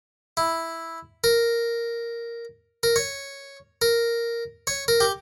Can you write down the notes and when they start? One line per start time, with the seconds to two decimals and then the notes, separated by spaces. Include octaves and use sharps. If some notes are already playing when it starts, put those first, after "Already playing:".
0.37 E4
1.24 A#4
2.83 A#4
2.96 C#5
3.82 A#4
4.67 C#5
4.88 A#4
5.00 G4